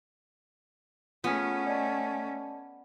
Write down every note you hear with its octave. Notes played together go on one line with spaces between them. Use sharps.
A3 B3 C#4 F4 G#4 F6
D5 D#5 A5